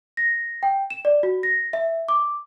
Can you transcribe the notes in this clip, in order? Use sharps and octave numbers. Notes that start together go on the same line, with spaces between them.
A#6
G5
E7
D5
F#4
A#6
E5
D6